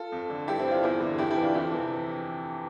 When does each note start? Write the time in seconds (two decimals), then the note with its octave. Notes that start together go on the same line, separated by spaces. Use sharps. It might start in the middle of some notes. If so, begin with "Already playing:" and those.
Already playing: F4 A4
0.12 F2
0.30 D3
0.47 G2 E4 G4
0.59 C4 E4
0.65 D3
0.71 D4 F4
0.83 E2 E4 G4
1.01 D3
1.18 F2 E4 G4
1.30 E4 G4
1.37 E3
1.43 D4 F4
1.54 F2 E4 G4
1.72 C3 E3